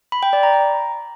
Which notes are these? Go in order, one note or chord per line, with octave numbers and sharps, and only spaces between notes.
B5
G5
D5
A#5
A#5